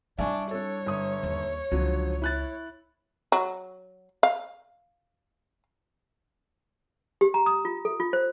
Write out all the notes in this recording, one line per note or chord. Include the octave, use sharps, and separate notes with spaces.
G3 D4 E4 E5 G#5 C#6
D4 A4 C#5
G1 D#6
D#2
C#2 D3 F3 F#3
E4 F#6 A6
F#3
F5
G4
A#5
D#6
F4
A4
F4
C5